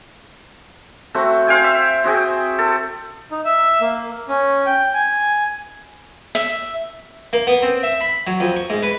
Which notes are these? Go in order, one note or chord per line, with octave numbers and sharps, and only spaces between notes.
A3 C4 F#4
C5 F5 G5 G#5
E5
C4 F#4 G#4 G5
A4
D#4
E5
A#3
C#4
G5
G#5
E5
A#3
B3
C4
E5
B5
F#3
F2
C#6
G#2
B4